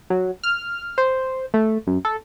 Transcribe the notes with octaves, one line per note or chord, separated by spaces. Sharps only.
F#3
F6
C5
A3
F#2
A4